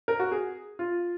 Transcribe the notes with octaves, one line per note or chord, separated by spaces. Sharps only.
A#4
F#4
G#4
F4